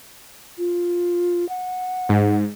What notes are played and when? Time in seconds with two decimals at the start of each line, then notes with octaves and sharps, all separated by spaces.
0.58 F4
1.49 F#5
2.09 G#2